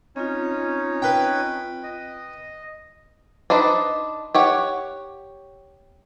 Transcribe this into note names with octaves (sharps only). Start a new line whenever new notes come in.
C4 C#4 D#4 F4 C#5
B4 G5
D#5
D4 D#4 B4 C5
G4 C#5 F#5